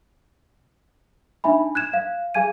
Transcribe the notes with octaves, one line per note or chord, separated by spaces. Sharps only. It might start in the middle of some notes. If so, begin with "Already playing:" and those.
D4 D#4 E5 G#5 B5
F#6 G#6 E7
F5
G#4 F5 G#5 G#6 D#7